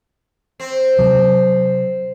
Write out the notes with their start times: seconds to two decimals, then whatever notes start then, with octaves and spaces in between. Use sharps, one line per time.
0.60 C4
0.99 C3 F#3